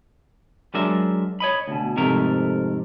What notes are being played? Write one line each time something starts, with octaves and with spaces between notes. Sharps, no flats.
F#3 G#3 D4 A#4 E5
C#5 D#5 B5
D2 B2
F2 G#2 C3 A3 A#4